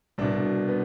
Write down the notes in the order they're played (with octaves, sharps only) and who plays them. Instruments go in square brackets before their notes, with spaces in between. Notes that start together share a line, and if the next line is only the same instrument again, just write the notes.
[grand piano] C2 B2 D4
B3